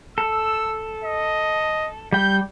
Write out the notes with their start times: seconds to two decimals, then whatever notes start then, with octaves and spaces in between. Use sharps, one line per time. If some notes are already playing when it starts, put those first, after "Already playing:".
0.18 A4 E6
1.03 D#5
2.12 G3 G5 G6